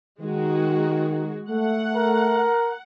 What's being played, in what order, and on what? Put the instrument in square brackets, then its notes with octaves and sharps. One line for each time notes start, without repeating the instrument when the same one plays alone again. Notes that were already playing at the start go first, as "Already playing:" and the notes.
[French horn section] D#3 [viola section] G#3 F#4
[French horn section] A3 [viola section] F#5
[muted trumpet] A#4